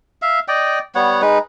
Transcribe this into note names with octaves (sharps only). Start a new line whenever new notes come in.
E5 F5
D5 D#5 G5
G3 B3 C#5 F#5
G#3 D#4 B4